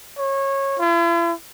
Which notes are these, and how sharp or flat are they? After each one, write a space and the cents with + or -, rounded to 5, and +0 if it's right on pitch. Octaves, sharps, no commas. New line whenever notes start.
C#5 -20
E4 +45